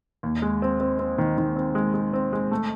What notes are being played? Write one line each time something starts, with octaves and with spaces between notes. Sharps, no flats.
D#2
G#3
C4
C4
C4
D#3
D#3
C4
G#3
G#3
C4
G#3
A3